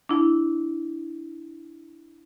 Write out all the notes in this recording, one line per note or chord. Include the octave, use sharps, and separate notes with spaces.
D4 E4